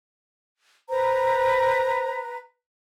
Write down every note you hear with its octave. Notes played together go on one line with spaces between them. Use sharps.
B4 C5 A#5